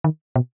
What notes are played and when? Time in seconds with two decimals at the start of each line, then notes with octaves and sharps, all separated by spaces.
0.04 D#3
0.36 B2